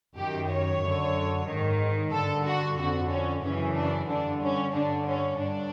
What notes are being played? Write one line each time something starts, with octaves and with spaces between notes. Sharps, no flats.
F#2 D#3 G4
C#5
F#2 D3
G#2 D#3
G2 D3 A4
F#4
F2 D3 F#4
C#4
F#2 C#3 E3 C#4
D4
G2 D3 D4
C#4
G2 D3 D4
C#4
G2 D4